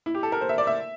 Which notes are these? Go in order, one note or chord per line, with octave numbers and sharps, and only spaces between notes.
E4
G4
A4
A#4
C5
E5
D5
E5